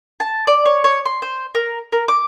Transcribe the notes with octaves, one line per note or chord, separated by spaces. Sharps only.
A5
D5
C#5
C#5
C6
C5
A#4
A#4
D6